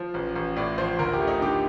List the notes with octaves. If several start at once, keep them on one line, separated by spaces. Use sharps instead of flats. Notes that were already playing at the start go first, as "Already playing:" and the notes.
Already playing: F3
A1
A1
A2 D5
F3 C5
D2 A#4
G4
A3
D#4
D3 G4